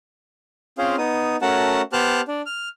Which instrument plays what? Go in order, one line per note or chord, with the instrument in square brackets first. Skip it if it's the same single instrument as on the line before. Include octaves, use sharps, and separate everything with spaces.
[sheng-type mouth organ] C4 C#4 F4 G#4 C5 F5
B3 D#4 D#6
A3 C#4 F#4 A#4 F#5 A5
B3 G4 C5 A5 F6 F#6
D4
F6